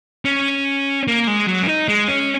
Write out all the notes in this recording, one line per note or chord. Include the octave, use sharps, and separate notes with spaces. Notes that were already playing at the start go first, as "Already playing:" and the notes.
C#4
A#3
G#3
F#3
C#4
D#4
G#3
C#4